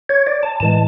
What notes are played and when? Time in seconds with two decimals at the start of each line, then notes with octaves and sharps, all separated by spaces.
0.09 C#5
0.27 D5
0.43 A5
0.60 A2 E3 G#3 A5